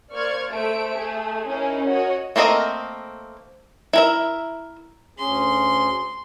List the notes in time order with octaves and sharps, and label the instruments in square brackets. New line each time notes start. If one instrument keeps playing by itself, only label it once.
[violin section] A#3 C5 D5 C#6 F6 G#6
A3 C5 E5 D7
A3 G#4
C#4 D#4 E4 G#4 A#4
F#4 A#4 C#5 D#5
[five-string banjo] A3 A#3 C4 A#4 D#5
E4 A#4 E5
[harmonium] D2 C#4 G#4 [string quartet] C6